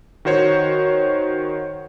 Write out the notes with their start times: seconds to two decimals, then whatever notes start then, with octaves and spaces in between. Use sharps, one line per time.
0.25 D#3 F#4 C5 C#5